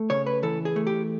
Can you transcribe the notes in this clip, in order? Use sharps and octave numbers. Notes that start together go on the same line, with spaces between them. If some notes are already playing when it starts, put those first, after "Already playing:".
Already playing: A3
C#3 C#5
B4
E3 A4
G#4
A3
G4